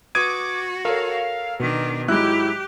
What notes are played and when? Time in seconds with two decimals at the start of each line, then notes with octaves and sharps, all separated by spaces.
0.15 F#4 B4 D6 D#6 G#6 D#7
0.85 A4 A#4 C#5 F5
1.60 B2 D#3 D4
2.08 G#2 F#3 G#3 E4 G4 F#6